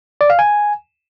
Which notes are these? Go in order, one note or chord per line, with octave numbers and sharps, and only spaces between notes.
D5
F5
G#5